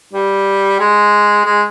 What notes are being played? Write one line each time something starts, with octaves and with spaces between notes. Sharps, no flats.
G3
G#3
G#3